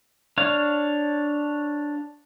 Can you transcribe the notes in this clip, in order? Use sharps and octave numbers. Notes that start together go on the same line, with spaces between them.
D4 C#5 F5